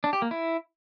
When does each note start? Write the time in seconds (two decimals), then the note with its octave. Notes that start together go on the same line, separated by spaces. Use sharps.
0.04 D4
0.13 G4
0.22 A#3
0.31 E4